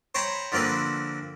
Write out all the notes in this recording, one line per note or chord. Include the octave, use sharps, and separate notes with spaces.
C5 C#5 G5 A#5 B5
D3 F3 A#3 C4 B4